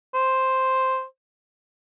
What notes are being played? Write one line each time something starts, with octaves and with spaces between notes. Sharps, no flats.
C5